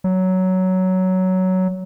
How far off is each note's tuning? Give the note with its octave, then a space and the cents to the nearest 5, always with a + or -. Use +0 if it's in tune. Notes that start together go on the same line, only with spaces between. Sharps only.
F#3 +10